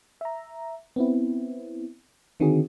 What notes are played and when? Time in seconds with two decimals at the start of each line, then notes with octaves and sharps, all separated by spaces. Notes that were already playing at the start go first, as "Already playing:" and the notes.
0.21 E5 A#5
0.96 B3 C4 E4
2.40 D3 D#3 C4 D#4 F#4 G#4